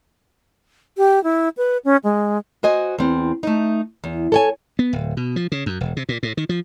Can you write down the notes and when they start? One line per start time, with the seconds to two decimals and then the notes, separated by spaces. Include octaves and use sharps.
0.97 G4
1.24 E4
1.57 B4
1.85 C#4
2.04 G#3
2.63 F#4 C5 D#5 G#5
2.99 E2 C4
3.43 A3 D#4
4.04 E2
4.32 A4 C#5 G#5
4.79 B3
4.93 D1
5.17 B2
5.36 F3
5.52 C#3
5.66 F#2
5.81 E1
5.97 C3
6.09 A#2
6.23 A2
6.37 D#3
6.49 F3